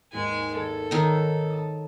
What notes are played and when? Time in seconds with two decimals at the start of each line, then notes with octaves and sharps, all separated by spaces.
0.13 D#2 G#2 G#3 G#5
0.56 G#1 A4 G#6
0.91 D#3 D#4 C#5 E6
1.50 A5 D#6